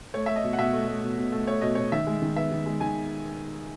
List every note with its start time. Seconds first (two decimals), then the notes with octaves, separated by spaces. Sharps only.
0.14 A3 C#5
0.26 A3 E5
0.36 D#5
0.44 B2
0.53 F#5
0.58 B2 E5
0.73 A3
0.88 A3
1.03 B2
1.18 B2
1.32 A3
1.47 A3 C#5
1.61 B2 D#5
1.75 B2 C#5
1.92 D#3 E5
2.07 G#3
2.22 D#3
2.36 B3 E5
2.51 D#3
2.66 G#3
2.80 D#3 G#5